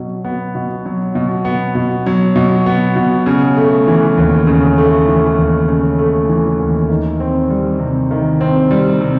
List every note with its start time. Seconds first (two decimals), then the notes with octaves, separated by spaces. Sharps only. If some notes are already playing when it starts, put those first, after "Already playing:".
Already playing: B2 F#3
0.24 B3
0.55 B2
0.85 F#3
1.15 B2
1.45 B3
1.75 B2
2.06 F#3
2.36 B2
2.66 B3
2.96 B2
3.26 C#3
3.57 A3
3.88 E3
4.18 D#2
4.47 C#3
4.78 A3
5.08 E3
5.39 D#2
5.69 C#3
5.99 A3
6.29 E3
6.60 D#2
6.89 D#3
7.20 C4
7.50 G3
7.79 C3
8.11 D#3
8.41 C4
8.71 G3
9.01 C3